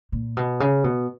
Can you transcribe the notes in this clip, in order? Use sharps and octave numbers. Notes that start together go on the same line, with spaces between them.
A#2
B2
C#3
B2